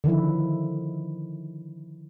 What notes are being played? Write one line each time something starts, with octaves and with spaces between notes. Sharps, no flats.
D3 D#3 F3 E4